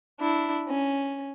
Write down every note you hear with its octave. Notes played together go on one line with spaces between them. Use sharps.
D4 E4
C#4